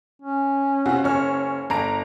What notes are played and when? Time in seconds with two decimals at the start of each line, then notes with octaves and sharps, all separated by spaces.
0.22 C#4
0.86 C3 F4 F#4
1.04 F#1 C#5 F6
1.70 G1 A#5 D7